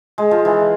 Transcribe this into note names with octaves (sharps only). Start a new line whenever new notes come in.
G#3
F3
E3